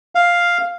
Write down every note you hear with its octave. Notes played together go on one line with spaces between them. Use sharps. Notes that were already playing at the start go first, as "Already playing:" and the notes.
F5